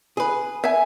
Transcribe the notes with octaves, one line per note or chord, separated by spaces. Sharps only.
G#4 B4
E5 G#5